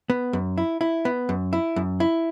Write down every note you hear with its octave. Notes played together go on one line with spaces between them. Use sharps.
B3
F#2
E4
E4
B3
F#2
E4
F#2
E4